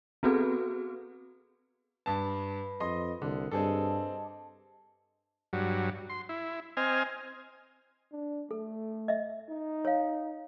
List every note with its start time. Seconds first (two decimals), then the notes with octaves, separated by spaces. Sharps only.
0.23 B3 C4 F#4 G#4 A4 B4
2.06 G2 B4 A5 B5
2.80 F2 D#5 C6 D#6
3.22 C2 D3 D6
3.52 G2 C4 G#4 A4 D#5 A5 D6
5.53 G2 F#3
6.10 C6
6.29 E4
6.77 C4 D#5 G#5 F6
8.12 D4
8.51 A3 A4
9.08 D#5 E5
9.49 D#4
9.85 C#5 F5